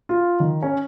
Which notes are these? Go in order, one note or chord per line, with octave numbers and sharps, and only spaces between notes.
F4
D#3
C#4